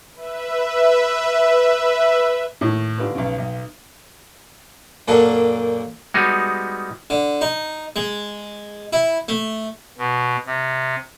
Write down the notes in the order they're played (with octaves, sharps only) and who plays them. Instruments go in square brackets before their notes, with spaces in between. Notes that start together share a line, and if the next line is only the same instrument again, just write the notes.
[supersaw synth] B4 E5
[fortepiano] A2 D#3
G#2 D3 F4 G4 B4
B1 C#3
B1
[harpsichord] F#2 A#2 A#3 D4 A4 A5
[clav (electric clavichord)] G3 G#3 B3 D#4 F#4 G#4
[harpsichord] D3
D#4
G#3
E4
A3
[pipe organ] B2
C3